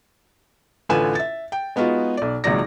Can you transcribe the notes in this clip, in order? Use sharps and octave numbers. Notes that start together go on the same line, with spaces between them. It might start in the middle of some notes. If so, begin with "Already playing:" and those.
A1 D3 F4 B4 G#5 E7
E5 A6
G5
G#3 B3 D#4 F4 F#4
B1 D5
G#1 C#2 A#2 F#3 D5 A#6